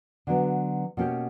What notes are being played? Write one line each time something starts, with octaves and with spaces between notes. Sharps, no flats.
D3 F#3 B3 D4
B2 A#3 C#4 G4